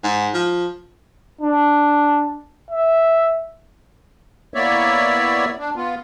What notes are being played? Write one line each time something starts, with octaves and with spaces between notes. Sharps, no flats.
G#2
F3
D4
E5
A#3 B3 E4 C#5 D5 E5
D4
B3 F4